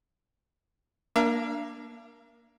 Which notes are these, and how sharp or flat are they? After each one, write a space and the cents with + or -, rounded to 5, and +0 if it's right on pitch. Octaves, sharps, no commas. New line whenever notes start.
A#3 +15 D4 +0 F5 -45